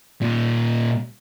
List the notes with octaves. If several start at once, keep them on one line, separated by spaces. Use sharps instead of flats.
A#2 D#4